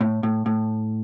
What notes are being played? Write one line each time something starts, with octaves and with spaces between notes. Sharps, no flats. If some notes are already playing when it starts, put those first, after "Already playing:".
A2
A2
A2